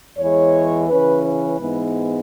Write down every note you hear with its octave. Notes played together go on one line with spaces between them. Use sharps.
E2 E3 G#3 C#5
C#3 E3 C#4 B4
B4
G#2 E3 G#3 B3